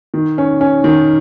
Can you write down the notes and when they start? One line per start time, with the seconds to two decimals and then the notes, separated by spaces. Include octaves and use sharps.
0.14 D#3
0.38 C#4
0.61 C#4
0.84 D#3